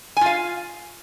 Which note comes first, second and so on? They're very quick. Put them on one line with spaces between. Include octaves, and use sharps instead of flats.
G#5 F4 F5